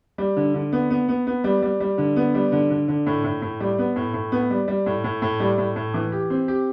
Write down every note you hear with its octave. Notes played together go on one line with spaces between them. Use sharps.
G3
D3
D3
B3
B3
B3
B3
G3
G3
G3
D3
B3
G3
D3
D3
D3
A2
A2
A2
G3
B3
A2
A2
B3
G3
G3
A2
A2
A2
G3
A2
A2
E3
G4
C4
G4